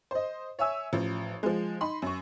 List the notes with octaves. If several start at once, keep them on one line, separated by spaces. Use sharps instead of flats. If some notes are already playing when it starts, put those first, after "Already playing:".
C5 D#5
C#5 E5 G#5 E6
A1 F3
F3 G#3
D#4 B5 C6
F#2 C#6